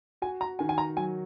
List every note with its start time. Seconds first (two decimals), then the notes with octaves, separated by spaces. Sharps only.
0.22 F#4 G#5
0.41 A#5
0.59 D#3 G#5
0.69 G#5
0.78 A#5
0.97 F#3 G#5